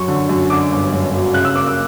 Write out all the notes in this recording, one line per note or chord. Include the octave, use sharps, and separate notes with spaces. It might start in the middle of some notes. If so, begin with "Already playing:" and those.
Already playing: F#2 F#3 C#6
D3
F#2
D3 D6
G1
F#2
F#3
C#3 F#6
E6
A#3 D6
E6